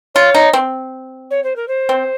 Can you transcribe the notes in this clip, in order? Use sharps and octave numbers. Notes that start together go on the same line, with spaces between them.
F4 C#5
D#4
C4
C#5
C5
A#4
C5
C4